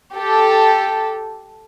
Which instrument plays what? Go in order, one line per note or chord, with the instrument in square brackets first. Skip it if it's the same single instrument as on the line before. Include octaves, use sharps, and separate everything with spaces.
[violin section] G4 A4